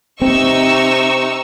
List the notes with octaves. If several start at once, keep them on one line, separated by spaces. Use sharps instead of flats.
C3 C4 D#4 C#6 E6